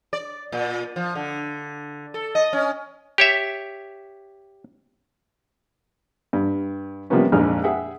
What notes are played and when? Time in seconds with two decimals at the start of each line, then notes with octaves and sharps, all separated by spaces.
0.13 D5
0.52 A#2
0.96 F3
1.15 D3
2.14 A4
2.35 D#5
2.53 C#4
3.18 G4 C#5 E5
6.33 G2
7.10 C3 F3 G3 A#3 B3 C#4
7.32 A#1 F2 G#3 D#4 F6
7.64 G#4 E5 F#5 G5